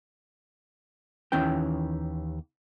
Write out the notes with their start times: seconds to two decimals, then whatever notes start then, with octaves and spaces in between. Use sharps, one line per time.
1.32 D#2 D#3 E3 C#4 G5